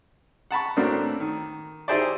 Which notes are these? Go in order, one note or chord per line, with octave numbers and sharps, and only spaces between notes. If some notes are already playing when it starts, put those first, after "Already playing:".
F#5 A5 B5 C#6
A2 A3 A#3 C4 D4 F#4
D#3
D#4 E4 G4 G#4 C5 D5